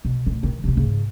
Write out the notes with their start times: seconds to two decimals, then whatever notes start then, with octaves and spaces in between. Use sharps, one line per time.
0.05 B2
0.27 A#2 A3
0.43 D#3 E3
0.64 C3 A3
0.76 G#2 C#3